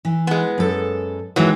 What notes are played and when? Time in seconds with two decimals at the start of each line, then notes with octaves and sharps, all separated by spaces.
0.05 E3
0.27 G#3 B3
0.58 F#2 A4
1.36 D#2 D#3 E3 F#3 G#3